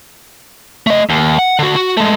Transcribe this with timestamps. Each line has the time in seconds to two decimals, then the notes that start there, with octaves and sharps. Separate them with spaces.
0.87 A3 D#5
1.10 D#2
1.39 F#5
1.59 D3 F#4
1.76 F#4
1.97 G#3 A3